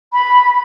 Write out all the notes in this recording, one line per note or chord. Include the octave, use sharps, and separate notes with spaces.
B5